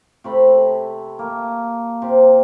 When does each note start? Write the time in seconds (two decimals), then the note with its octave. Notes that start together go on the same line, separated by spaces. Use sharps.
0.24 C3 A3 B5
1.19 A#3
2.02 C3